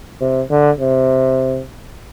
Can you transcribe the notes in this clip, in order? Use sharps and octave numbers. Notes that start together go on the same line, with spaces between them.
C3
D3
C3